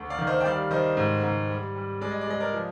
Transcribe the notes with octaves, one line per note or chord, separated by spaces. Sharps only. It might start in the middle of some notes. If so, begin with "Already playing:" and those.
Already playing: D2
D5 F5
D#3
C5 D#5
G5
G3 D5 F5
D#3 C5 D#5
G#2
G#2
G3
G3
G#3 D5
D#5
D5
G#3 D#5
A#4 D5
F3